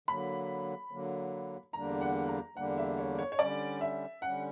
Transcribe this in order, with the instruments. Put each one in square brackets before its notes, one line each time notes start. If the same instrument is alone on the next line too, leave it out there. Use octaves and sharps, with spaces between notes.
[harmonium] D3 F#3 A#3 [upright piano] B5
[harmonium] D3 F#3 A#3
[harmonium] E2 D3 G3 A#3 D4 [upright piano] A#5
[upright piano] F#5
A#5
[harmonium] E2 D3 G3 A#3 D4 [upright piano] F#5
[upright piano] E5
C#5
C#5
C#5
[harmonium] D3 G3 C#4 [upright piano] D5
[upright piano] E5
[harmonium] D3 G3 C#4 [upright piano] F#5